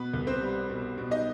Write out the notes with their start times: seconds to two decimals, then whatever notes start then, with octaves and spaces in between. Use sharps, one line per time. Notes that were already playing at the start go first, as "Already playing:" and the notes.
Already playing: B2 B3 B4
0.14 C2
0.27 C4 C5
0.40 G3
0.69 B2
0.98 B2
1.11 D#4 D#5